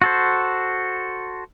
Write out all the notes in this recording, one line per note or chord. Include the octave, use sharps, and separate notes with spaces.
F#4 A4 C5